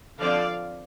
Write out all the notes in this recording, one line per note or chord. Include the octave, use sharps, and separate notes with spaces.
D3 F3 C4 D5 F5